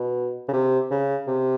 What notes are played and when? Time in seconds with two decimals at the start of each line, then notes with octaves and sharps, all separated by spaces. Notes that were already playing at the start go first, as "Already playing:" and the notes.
Already playing: B2
0.48 C#3
0.53 C3
0.91 C#3
1.27 C3